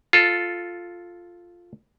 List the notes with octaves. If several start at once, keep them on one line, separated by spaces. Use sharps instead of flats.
F4 A4